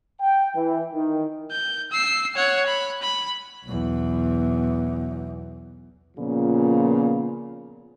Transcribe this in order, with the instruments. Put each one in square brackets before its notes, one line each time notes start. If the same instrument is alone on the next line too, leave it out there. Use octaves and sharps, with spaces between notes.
[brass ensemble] G5
E3
D#3
[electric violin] G6
E6 C7
C#5 F#5
B5
B5
[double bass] B1 E2
[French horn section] A#2 C#3 F3 B3 F4